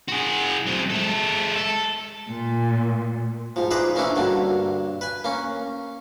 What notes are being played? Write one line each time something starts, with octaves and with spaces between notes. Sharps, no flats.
F#4 G#4
F#3 C4
G#3 A4
A4
A#2
G#2 F3
D#4 G#4 B4 C5 D5 D#5
E3 A#3 C#4 D4 E4
G2 D3 F#3 A#3
B4 G#5
A#3 C#4